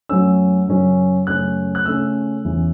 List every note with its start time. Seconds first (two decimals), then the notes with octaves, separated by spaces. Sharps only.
0.09 F#2 F#3 A3 C#4 E6
0.68 F#2 C#3 F#3 C#4
1.27 F#2 C#3 A3 C#4 F#6
1.75 F#6
1.85 C#3 A3 C#4 E6
2.44 E2 E3 C#4